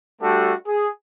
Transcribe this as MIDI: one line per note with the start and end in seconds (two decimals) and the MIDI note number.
0.22 0.54 55
0.22 0.54 57
0.22 0.54 62
0.22 0.54 66
0.22 0.54 67
0.22 0.54 69
0.67 0.88 68